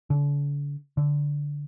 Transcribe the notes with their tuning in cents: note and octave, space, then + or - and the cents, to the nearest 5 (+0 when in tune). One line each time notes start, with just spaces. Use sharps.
D3 -40
D3 -10